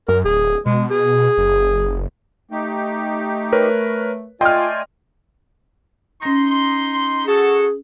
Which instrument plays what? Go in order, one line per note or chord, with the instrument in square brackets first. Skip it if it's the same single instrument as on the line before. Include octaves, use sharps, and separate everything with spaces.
[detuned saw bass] F#2 [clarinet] A#4
[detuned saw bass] D1 [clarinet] G#4
[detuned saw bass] B2 [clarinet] G#3
[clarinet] G#4
[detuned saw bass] F#1
[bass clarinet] A3 [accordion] D#4 G4
[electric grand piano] A#4 B4 C#5
[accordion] A3 D5 G#5 [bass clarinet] F4 [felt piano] D#5 F6 [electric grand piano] G5 C6
[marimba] C#4 A#6 [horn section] D#4 C6
[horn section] F#4 A4 [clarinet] G#4